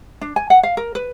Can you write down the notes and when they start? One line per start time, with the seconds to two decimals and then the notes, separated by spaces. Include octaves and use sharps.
0.21 D4
0.36 G#5
0.50 F#5
0.63 F5
0.77 A#4
0.95 B4